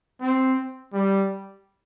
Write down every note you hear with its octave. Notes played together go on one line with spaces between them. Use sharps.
C4
G3